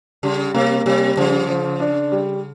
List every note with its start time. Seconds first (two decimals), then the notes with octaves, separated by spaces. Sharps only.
0.23 C#3 G3
0.54 C3 A#3
0.86 C3 G3
1.17 C#3 F3
1.49 F3
1.80 D4
2.12 G3